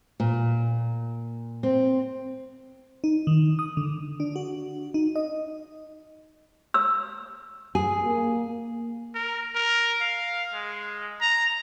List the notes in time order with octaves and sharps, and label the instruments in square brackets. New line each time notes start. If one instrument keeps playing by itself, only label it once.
[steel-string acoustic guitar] A#2
C4
[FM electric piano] D#4
D#3
D#6
D3
D4
F#4
D#4
D#5
[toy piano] E6
[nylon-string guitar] G#4
[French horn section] A#3
[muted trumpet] A#4
A#4
F5
G#3
A#5